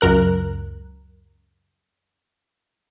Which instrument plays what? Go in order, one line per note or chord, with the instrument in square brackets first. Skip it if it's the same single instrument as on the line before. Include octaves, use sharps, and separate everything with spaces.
[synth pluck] C#2 F#2 A#4 F#6